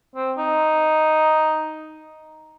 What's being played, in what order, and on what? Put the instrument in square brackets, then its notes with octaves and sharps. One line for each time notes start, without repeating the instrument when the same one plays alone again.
[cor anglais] C4
D#4